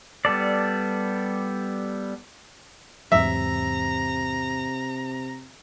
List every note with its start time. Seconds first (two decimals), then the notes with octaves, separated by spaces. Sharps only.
0.25 G3 B3 A4 D5
3.12 E2 G#2 C3 F#3 E5 A#5